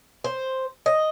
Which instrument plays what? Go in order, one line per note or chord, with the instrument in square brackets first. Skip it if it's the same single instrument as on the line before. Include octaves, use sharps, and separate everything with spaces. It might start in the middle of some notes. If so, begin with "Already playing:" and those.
[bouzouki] C5
D#5